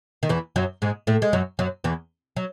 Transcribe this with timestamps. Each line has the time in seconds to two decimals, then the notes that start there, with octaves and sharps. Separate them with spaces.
0.23 D#3
0.29 E2 E3
0.56 F#2 F#3
0.82 G#2 G#3
1.07 A2 A3
1.22 G#3
1.33 F#2 F#3
1.59 F#2 F#3
1.84 E2 E3
2.36 F#3